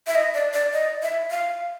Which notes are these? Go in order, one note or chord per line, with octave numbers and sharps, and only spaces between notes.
E5
D#5
D5
D5
D#5
E5
F5